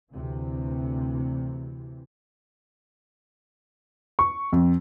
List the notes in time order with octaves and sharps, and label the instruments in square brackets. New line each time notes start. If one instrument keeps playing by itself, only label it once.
[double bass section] D2 C3 E3
[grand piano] C#6
F2